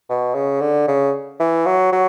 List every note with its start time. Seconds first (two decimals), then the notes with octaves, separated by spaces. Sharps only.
0.09 B2
0.35 C#3
0.61 D3
0.88 C#3
1.40 E3
1.66 F#3
1.92 F#3